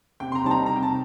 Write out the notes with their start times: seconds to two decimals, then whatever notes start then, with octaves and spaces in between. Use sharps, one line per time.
0.20 C3 G5
0.32 C6
0.35 A#5
0.44 G3 C4 D#4 A5
0.51 A#5
0.66 C3 A#5
0.76 G5
0.83 A5